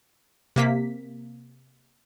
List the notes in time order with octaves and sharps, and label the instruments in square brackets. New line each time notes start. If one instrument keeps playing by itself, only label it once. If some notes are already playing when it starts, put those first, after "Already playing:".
[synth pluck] C3 A#3 B6